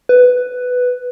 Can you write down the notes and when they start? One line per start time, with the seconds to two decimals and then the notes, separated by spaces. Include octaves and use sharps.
0.09 B4